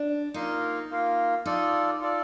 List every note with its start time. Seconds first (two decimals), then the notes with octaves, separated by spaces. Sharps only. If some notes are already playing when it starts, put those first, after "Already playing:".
Already playing: D4
0.34 A#3 D#4 F4 A#4 F5
0.90 A#3 F4 A#4 F5
1.45 D#4 F4 A4 D5
2.02 F4 A4 D5